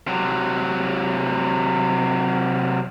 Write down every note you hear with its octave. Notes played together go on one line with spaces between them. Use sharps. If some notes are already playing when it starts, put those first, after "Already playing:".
C3 F#3